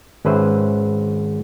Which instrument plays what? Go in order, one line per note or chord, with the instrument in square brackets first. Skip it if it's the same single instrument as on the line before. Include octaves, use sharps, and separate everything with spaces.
[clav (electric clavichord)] G#1 C#4 B4 C5 E5